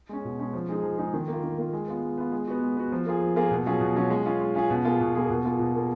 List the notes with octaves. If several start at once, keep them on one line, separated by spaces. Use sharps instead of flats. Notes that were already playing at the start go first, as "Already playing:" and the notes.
G#3 C#4
B2
G#3 C#4
F3
G#3 D#4 G#4
F3
G#3 D#4 G#4
D#3
A#3 F4
D#3
A#3 F4
G#3
B3 F4
G#3
B3 F4
G#3
B3 F#4
G#3
B3 F#4
F3
A#3 F4 G#4
F3
A#3 F4 G#4
B2
F#3 C#4 F4 G#4
B2
F#3 C#4 F4 G#4
G#3
C#4 F4 G#4
G#3
C#4 F4 G#4
B2
A#3 F4 G#4
B2
A#3 F4 G#4
B2
A#3 F4 G#4
B2
A#3 F4 G#4